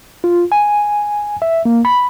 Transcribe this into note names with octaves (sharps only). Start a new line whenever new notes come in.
F4
G#5
E5
A#3
B5